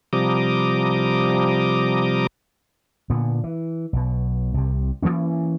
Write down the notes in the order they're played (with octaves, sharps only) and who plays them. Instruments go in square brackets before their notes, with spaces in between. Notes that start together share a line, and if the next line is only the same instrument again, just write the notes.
[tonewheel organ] C3 F3 G3 A#5 D6 D#6
[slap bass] A#2 D3 B3
E3
B1 B2
C2 C3
E3 F#3 A#3 C#4